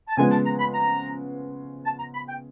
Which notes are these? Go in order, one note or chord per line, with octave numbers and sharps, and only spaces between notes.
A5
C#3 F3 G#3 B3 G#5
A5
A#5
B5
A#5
A5
A#5
B5
G5